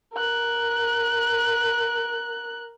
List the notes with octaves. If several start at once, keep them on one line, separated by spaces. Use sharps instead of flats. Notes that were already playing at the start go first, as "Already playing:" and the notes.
A#4 F#6